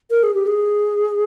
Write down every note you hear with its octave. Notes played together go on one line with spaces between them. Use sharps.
A#4
G#4
G4
G#4